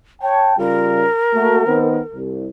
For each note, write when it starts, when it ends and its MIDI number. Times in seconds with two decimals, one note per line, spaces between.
0.22 0.54 73
0.22 0.57 79
0.22 0.57 81
0.58 1.06 49
0.58 1.06 55
0.58 1.06 65
0.58 2.16 70
1.35 1.66 57
1.35 1.66 58
1.35 1.66 66
1.67 2.00 51
1.67 2.00 59
1.67 2.00 60
2.14 2.48 36